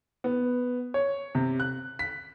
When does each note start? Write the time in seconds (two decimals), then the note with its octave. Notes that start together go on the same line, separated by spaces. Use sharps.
0.24 B3
0.94 C#5
1.35 C3
1.60 F#6
1.99 B6